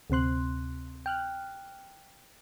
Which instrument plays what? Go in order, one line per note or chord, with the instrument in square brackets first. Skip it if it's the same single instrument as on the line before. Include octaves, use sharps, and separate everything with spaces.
[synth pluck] D2 C3 C4 C6 F#6
G5 F6 F#6